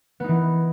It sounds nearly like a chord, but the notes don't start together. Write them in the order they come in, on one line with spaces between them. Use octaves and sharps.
B3 D#4 E3